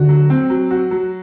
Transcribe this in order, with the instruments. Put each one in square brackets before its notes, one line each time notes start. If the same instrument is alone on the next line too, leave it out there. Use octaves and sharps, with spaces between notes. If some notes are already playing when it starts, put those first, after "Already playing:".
Already playing: [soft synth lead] D3 [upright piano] F#4
[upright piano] F#3
C4
F#3
F#4
F#3